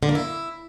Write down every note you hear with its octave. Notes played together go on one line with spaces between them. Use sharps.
D3
A#3
E4